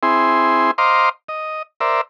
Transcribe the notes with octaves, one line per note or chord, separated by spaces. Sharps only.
C4 E4 G#4 C6
C5 D#5 F5 A#5 C6 D6
D#5
A#4 C5 D5 E5